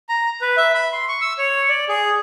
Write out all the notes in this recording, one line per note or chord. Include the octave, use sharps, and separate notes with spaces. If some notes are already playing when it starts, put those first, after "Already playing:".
A#5
B4
E5
B5
C6
C#6
E6
C#5
D5
G#4